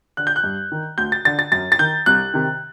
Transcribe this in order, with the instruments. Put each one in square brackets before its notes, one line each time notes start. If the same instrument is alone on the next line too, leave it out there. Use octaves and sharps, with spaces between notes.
[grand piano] D3 F#6
G6
F#6
G2
D#3
D2 G6
A6
D3 A6
A6
F#2 A6
A6
D#3 G6
C2 F#6
C3 D#3